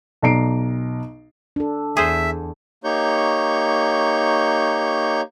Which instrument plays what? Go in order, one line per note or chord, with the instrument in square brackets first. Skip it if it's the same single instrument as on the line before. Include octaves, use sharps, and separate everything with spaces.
[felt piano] B1 D5 A#5 C7 D7
[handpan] D4 A4
[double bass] E2 [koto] G#4 C5 [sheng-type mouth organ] E5
[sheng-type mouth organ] A#3 D#4 G4 C#5 C#6 G6